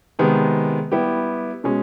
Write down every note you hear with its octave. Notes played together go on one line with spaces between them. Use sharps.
C3 D#3 G#3 B3
G3 B3 E4 G4
B2 G#3 C#4